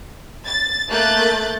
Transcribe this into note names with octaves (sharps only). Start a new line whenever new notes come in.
A6
A3 A#3 F#6 G6 A6